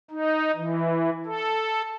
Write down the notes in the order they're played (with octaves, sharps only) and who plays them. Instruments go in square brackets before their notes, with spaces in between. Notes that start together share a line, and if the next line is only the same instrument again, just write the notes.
[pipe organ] D#4
E3
A4